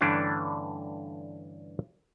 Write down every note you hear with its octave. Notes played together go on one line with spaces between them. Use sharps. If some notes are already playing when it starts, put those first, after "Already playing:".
G2 D3 E3 A3 C#4 D4